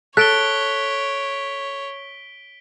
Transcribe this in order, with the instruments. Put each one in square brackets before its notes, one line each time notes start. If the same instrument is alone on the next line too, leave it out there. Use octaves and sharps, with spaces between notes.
[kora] A4 [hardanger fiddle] C#5 [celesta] F#6 [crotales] B6 D7 G7